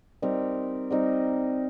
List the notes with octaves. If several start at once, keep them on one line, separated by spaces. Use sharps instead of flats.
G3 C4 D#4 A#4
G3 C4 D#4 A#4